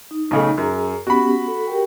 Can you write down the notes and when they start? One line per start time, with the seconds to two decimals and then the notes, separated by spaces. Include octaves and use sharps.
0.11 D#4
0.31 B1 C#3 A3
0.58 F#2 G#4 A#5
1.07 B3 C#4 F#4 G4 B5
1.48 A4
1.67 G4 A#4 G5